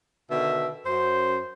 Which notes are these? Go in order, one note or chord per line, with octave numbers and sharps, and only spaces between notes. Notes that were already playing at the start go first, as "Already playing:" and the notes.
B2 D3 D#3 E5
F#2 C5